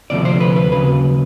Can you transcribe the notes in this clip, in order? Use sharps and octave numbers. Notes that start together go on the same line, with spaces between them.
D2 C3 F3 A3 D5
C5
B4
B4
D#2 C#3 F#3 B4